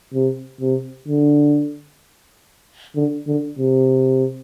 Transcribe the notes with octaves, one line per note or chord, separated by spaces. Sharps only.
C3
C3
D3
D3
D3
C3